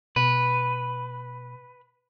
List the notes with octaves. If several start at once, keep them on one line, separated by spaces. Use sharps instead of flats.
B2 B4